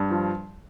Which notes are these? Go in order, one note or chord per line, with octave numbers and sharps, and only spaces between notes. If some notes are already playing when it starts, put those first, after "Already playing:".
Already playing: G2
F3